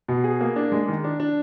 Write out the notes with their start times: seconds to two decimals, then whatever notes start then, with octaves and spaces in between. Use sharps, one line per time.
0.08 B2
0.24 G#4
0.41 A#3
0.56 D4
0.72 G#3
0.88 D#3
1.04 D4
1.20 D4